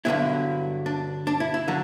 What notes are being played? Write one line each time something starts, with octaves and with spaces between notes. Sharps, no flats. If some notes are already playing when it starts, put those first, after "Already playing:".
G2 D3 F#3 B3 E4
D4
D4
E4
E4
D3 F#3 D4